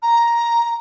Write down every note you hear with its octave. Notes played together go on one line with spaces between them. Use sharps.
A#5